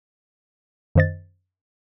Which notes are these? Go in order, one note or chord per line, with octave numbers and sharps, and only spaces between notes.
F#2 D#3 C5 D#5 A6